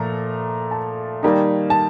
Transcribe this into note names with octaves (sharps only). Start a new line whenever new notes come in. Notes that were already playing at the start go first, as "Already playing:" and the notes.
Already playing: A#2 F3 A3 A#5
A5
D#3 G3 A#3 D#4
A5